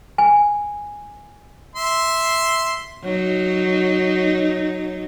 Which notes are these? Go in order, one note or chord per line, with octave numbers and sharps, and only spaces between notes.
G#5
E5 C6
F#3 D#4